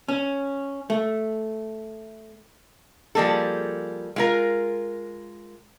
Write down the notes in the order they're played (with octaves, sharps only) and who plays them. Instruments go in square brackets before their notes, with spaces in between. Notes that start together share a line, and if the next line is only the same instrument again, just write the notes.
[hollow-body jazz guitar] C#4
A3
[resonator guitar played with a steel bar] F3 G3 A#3 G#4 A4
G#3 F4 A#4